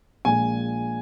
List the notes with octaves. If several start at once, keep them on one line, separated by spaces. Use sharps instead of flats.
A#1 A#2 G#3 G#5